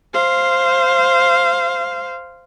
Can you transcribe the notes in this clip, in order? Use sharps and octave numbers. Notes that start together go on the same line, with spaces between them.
C5 F5